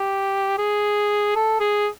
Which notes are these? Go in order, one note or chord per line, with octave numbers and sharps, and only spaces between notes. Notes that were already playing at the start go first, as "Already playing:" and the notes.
Already playing: G4
G#4
A4
G#4